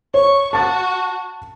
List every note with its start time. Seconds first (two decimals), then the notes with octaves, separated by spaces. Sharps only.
0.14 C#5 C#6
0.53 F#4 A5 A6